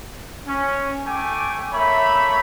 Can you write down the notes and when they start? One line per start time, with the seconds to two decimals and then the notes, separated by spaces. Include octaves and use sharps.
0.47 C#4
1.05 A3 G5 G#5 D6
1.73 A3 A#3 C#5 E5 B5